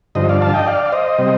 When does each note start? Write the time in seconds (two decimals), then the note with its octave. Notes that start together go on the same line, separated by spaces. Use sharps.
0.15 G2 D3 F3 C5 D#5
0.29 D5 F5
0.41 F5 A5
0.54 D#5 G5
0.67 D5 F5
0.86 F5
0.92 C5 D#5
1.18 C3 G3